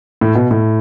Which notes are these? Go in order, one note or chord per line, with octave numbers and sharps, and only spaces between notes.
A2
B2
A2